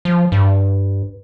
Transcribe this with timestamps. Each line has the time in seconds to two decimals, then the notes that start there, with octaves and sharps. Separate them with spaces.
0.05 F3
0.32 G2